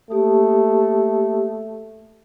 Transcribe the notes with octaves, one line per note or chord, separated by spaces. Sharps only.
A3 A#3 G4 D#6